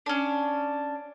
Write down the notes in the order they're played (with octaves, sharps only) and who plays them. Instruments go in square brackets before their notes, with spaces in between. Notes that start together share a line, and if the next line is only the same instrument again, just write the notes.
[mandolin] C#4 D4